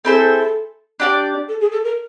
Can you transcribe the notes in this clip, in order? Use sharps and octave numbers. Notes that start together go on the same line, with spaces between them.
C4 E4 G#4 A4 C5
D4 G4 B4 D5
A4
G#4
A4
A#4